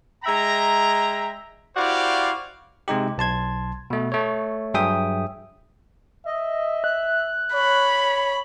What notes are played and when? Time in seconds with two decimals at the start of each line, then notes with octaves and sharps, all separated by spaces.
0.24 G#3 E5 G5 A#5
1.76 E4 F#4 G4 C5 D5 F5
2.88 C3 G#3 D#4 G4
3.18 B1 A5 C6 G#6
3.90 B2 A3
4.12 A3 C#5
4.74 G2 F#3 G#4 E5 G5 D#6
6.26 D#5 E5
6.84 F#6
7.54 C#5 B5